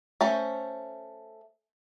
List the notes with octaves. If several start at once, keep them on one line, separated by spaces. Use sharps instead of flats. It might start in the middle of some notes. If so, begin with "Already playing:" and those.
A3 C#4 C5